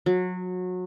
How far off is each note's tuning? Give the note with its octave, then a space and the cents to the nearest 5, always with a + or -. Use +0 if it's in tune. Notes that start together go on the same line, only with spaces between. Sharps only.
F#3 -25